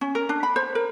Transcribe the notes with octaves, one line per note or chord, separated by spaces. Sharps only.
C#4
A#4
D4
B5
C5
A#4